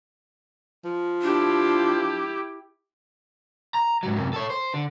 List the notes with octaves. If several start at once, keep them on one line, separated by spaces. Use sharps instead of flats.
F3
D4 E4 G4
A#5
G#2 F#3
F#2 C3
A4 C#5
C5
D3